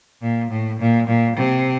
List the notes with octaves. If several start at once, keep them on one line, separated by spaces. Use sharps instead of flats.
A#2
A2
A#2
A#2
C3